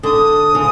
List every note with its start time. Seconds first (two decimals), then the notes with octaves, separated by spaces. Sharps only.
0.03 D3 D#6
0.55 C#3